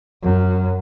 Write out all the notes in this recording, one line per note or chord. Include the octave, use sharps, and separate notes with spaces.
F#2